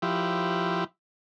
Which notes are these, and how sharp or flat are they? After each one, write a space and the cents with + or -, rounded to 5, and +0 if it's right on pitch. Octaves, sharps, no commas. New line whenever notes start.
F3 +0 E4 +5 G4 -10